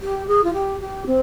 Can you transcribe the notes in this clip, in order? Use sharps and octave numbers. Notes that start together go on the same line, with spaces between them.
G4
G#4
F4
G4
G4
C4